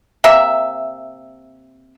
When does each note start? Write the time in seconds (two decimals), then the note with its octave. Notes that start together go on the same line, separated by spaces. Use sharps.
0.24 C3 A#3 E5